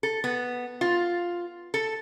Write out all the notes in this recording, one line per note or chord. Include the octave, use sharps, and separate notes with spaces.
A4
B3
F4
A4